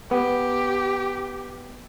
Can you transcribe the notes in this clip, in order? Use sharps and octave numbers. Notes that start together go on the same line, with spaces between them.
B3 G4